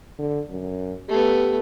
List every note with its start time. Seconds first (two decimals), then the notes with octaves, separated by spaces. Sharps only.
0.19 D3
0.50 F#2
1.09 A3 B3 G4